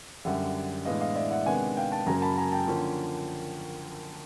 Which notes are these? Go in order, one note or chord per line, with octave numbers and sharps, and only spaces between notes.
F#2 D3 G3 E5 F#5
A2 E3 G#3 B3 D4 D#5 F5
D#5 F5
D5 E5
E5 F#5
C3 D#3 G#3 B3 D4 F#5 G#5
F5 G5
G5 A5
F#2 C#3 F#3 A#3 G#5 A#5
A#5
A5 B5
G#5 A#5
G5 A5
D3 F3 A#3 C#4